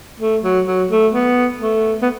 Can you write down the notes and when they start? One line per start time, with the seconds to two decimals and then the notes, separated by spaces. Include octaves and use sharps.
0.20 A3
0.44 F#3
0.67 F#3
0.91 A3
1.13 B3
1.61 A3
2.02 B3